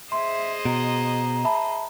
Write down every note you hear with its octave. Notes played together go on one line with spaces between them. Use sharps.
G#4 C5 D#5 E5 C6
B2 A#5
E5 A5 B5